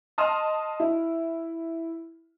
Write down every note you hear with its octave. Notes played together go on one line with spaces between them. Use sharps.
D#5 A5 C6 D#6 F6
E4